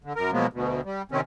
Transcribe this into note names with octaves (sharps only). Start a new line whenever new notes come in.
D3
F#2 A#4
B2 F3 F#3 G#3 A#3 B3
D2 B2
G3
C3 D#3 C4 C#4